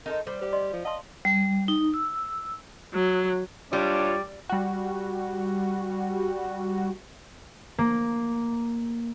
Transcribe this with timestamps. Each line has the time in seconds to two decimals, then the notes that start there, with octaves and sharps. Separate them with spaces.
0.06 D#4 A4 A#4 C5
0.27 G3 C5
0.41 G4 C5
0.53 D5 D#5 C6
0.73 F3
0.85 D#5 F5 A5 C6
1.25 G3
1.68 D#4
1.94 E6
2.94 F#3
3.73 G3 D4 F4 C#5 D5
4.49 G3 F#4
7.78 A#3